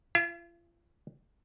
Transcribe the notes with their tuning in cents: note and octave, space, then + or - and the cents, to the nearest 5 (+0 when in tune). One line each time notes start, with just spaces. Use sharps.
F4 -40 E5 +35